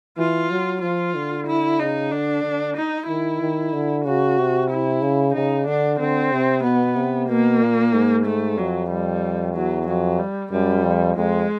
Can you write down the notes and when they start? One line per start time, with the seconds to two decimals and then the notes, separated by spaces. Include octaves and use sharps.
0.18 E3 F4
0.51 F#3
0.82 F3 F4
1.15 D3
1.47 E4
1.79 C#3 D#4
2.11 D3 D4
2.43 D3
2.76 D#4
3.08 D#3 E4
3.41 D#3
3.73 D3
4.05 C#3 F#4
4.38 C3
4.70 E4
5.02 C#3
5.34 C#3 D#4
5.66 D3 D4
5.99 D3 C4
6.32 C3
6.64 B2 B3
6.96 C3
7.29 B2 A#3
7.61 A#2
7.93 G#2
8.25 A3
8.58 F2 F#3
8.90 G3
9.55 E2 F#3
9.87 F2 F#3
10.19 G3
10.52 F#2 G3
10.83 F2
11.16 F2 G#3